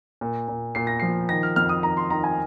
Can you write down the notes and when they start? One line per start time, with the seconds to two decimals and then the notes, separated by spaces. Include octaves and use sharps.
0.21 A#2
0.48 A#2
0.75 A#2 C7
0.87 A#6
1.00 F3 C7
1.29 D#3 A#6
1.43 F6
1.56 F2 F6
1.69 D#6
1.83 D#3 A#5
1.97 C6
2.10 D#3 A#5
2.24 G#5